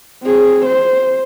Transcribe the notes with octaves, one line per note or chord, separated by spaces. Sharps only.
C4 G#4
C5